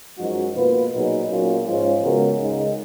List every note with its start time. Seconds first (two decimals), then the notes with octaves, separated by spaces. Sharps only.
0.19 F#2 F3 G#3 D#4 F#4
0.55 B2 A#3 F4 B4
0.92 A#2 F#3 B3 D#4 G#4
1.29 A#2 F#3 A#3 C#4 F4
1.65 G#2 F3 G#3 C#4 F4
2.02 C#3 G#3 B3 F#4 A#4
2.39 C#2 C#3 G#3 D#4